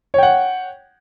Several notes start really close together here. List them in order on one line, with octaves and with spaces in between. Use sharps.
C#5 G5 F#5